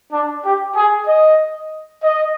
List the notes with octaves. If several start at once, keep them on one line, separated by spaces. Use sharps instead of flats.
D4
G4
G#4
D#5
D#5